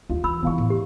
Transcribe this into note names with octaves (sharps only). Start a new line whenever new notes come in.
D#2 F4
E3 B5 E6
B1 E2 F4 F5 C#6
A2
G4